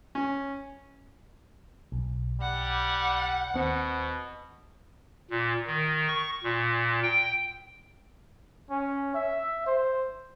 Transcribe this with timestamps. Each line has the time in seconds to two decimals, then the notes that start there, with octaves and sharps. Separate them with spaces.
0.15 C#4
1.92 B1
2.41 G3 F#5
3.54 D#2 B2 C4 C#7
5.30 A#2
5.67 D#3
6.08 C#6
6.44 A#2
7.03 G5
8.70 C#4
9.15 E5
9.67 C5